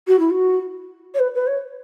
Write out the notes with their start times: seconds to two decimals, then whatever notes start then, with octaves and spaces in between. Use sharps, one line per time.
0.08 F#4
0.19 E4
0.30 F#4
1.14 C#5
1.19 B4
1.35 B4
1.47 C#5